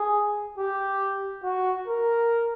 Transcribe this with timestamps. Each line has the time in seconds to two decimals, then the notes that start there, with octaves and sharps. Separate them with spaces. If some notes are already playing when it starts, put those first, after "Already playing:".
Already playing: G#4
0.58 G4
1.43 F#4
1.87 A#4